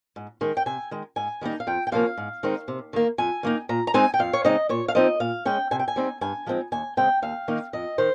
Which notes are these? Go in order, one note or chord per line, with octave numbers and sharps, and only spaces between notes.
G#2
D#3 G#3
G5
C3 G#5
D#3 G#3
G#2 G#5
D#3 G3 A#3 D#4
F5
F2 G5
G5
C3 F3 A#3 C#4 F5
G#2
D#3 G#3 C4 D#4
C3
D#3 A#3
F2 G#5
D#3 A#3 D#4
A#2 A#5
A#5
G#3 C4 D#4 G#5
G5
F2 F5
C#5
C#3 G#3 C4 D#4 D#5
A#2 C#5
F5
F3 C4 D#4 D#5
A#2 F5
G#3 C#4 G5
C3 G#5
G5
G#5
G3 C4 D#4
G2 G#5
F3 G#3 C4 D#4
D#2 G#5
C#3 G#3 C4 G5
D#2 F5
D#3 A#3 D#4
F2 D#5
D#3 C5